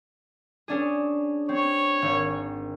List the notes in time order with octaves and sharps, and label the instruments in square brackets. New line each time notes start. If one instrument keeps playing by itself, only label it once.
[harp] C#4 D4 G#4
[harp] C4 [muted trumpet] C#5
[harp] G#1